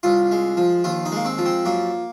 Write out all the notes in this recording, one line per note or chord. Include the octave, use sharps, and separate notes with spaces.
C2 F4
G#3
F3
D#2 F4
D#4
G#3 A#3
C4
F3
C4
F#2 A#3